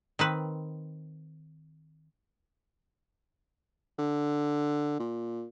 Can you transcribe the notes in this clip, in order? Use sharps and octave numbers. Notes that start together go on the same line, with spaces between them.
D#3 C4 B4
D3
A#2